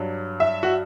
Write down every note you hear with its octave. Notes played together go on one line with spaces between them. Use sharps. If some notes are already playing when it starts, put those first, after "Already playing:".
Already playing: G2 F#3
E5
F#4